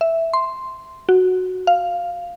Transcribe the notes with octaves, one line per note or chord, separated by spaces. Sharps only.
E5
C6
F#4
F5